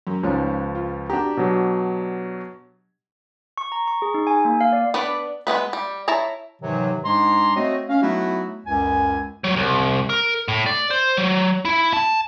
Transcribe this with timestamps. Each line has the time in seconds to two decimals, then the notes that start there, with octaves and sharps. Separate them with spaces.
0.07 F#2
0.23 C#2 G#2 F3 C#4
0.75 F4
1.10 D4 F#4 G4 A#5
1.37 B2 F#3
3.57 C#6
3.72 A#5
3.87 C#6
4.02 G#4
4.14 D#4
4.27 G#5
4.45 A#3
4.61 F5
4.73 D5
4.94 B3 D4 B4 D5
5.47 G#3 A3 B3 B4
5.73 G3
6.08 E4 C#5 A5 A#5
6.62 G#2 C3 D#3 E3 F#3
7.05 G#2 G#3 D4 A#5 C6
7.56 A3 C4 F#4 C#5 D#5
7.89 C#4 F5
8.02 F#3 A3 B3 D#4 E4 F#4
8.67 C#2 F#2 G#5
9.44 F#3
9.56 C2
10.09 A#4
10.48 A2
10.66 D5
10.91 C5
11.17 F#3
11.65 E4
11.93 A5